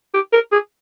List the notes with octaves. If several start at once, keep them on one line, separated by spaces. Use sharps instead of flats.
G4
A#4
G#4